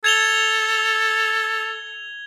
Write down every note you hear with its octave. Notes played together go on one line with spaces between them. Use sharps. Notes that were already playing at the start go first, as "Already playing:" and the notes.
A4 G#6 F7 G7